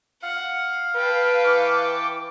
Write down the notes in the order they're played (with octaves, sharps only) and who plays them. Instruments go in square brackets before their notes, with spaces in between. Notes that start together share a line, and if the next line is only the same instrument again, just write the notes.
[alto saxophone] F5 [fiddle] F#5
[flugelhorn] B4 [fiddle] G5 A5
[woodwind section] E3 C#6 D6